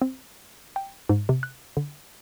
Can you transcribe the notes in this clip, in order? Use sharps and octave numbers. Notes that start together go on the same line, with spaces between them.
C4
G5
G#2
C3
F#6
D3